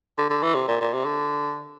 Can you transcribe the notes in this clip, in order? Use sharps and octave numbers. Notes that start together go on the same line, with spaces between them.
D3
D3
E3
C3
A#2
A#2
C3
D3